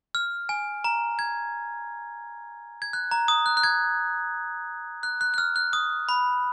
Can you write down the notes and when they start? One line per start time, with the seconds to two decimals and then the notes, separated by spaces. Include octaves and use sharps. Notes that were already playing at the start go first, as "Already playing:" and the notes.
0.15 F6
0.49 G#5
0.84 A#5
1.19 G#6
2.82 G#6
2.93 F#6
3.11 A#5
3.28 D#6
3.46 F#6
3.57 F#6
3.64 G#6
5.03 F#6
5.21 F#6
5.34 F#6
5.38 F6
5.56 F#6
5.73 D#6
6.09 B5